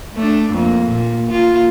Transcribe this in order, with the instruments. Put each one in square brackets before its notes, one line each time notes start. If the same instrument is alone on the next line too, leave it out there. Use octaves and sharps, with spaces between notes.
[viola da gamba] A3 D4
F2 A#3
A#2
A#3 F4